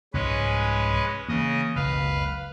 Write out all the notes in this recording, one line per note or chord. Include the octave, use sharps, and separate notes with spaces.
C2 G#2 F3 G#3 C#4 B4
C#3 E3 A#3 D#5
F#1 C#2 B2 B4 F5